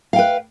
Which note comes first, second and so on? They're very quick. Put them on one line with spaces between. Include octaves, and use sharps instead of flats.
F5 G5 B4